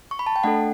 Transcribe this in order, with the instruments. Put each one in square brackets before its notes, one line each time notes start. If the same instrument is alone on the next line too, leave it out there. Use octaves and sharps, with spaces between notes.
[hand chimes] C#6
B5
A5
G5
A3 D4 A4 F#5